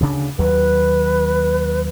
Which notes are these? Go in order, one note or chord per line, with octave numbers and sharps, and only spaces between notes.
D2 C#3 D4
D#2 F#3 B4